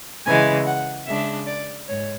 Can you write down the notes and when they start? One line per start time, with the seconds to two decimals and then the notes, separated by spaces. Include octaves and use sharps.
0.25 C#3 E3 G#3 G#5
0.66 F#5
1.06 C#3 G#3 D4 E5
1.47 D5
1.88 G#2 C#5